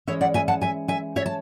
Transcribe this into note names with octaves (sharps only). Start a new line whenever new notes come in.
E3 G#3 C#4 C#5 E5
D5 F#5
E5 G#5
F#5 A5
E5 G#5
E5 G#5
C#5 E5
A5